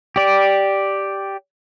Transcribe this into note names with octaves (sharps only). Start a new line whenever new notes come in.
G4 D5